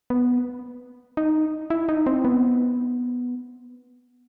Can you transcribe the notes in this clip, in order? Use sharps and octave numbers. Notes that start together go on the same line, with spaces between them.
B3
D#4
E4
D#4
C4
B3